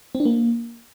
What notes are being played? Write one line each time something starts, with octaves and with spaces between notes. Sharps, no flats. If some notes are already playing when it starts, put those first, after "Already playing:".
C4
D4
A#3